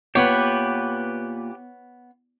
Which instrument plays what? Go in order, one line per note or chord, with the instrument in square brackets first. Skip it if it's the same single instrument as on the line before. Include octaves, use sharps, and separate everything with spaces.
[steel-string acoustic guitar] A#2 [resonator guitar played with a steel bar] B3 C#5 [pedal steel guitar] G4 B4